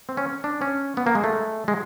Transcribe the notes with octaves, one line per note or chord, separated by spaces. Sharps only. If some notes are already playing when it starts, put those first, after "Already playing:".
C4
C#4
D4
C#4
B3
A#3
G#3
A3
G#3